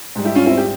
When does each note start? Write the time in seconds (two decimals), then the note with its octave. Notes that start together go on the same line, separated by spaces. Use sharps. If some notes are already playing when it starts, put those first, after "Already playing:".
0.15 G#2 G3
0.25 E4 G4
0.35 C#4 F4
0.46 C4 E4
0.57 G4